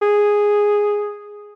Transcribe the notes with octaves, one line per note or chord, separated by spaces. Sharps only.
G#4